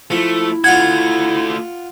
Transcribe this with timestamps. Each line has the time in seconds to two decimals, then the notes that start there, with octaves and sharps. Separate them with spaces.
0.11 F3 A3 E4
0.64 A3 F4 F#4 F#5 G#6